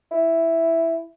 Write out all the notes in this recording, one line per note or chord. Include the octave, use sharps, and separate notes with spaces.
E4